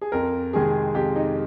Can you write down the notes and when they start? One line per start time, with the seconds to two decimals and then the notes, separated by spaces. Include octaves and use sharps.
0.01 G#4
0.12 F2 A#4
0.53 C3 D#3 G#3 G#4
0.94 F2 G4
1.16 D#4